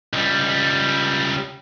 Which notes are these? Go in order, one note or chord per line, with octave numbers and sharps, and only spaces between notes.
C#2 G3